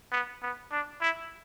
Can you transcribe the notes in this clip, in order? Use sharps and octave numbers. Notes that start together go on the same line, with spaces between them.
B3
B3
D4
E4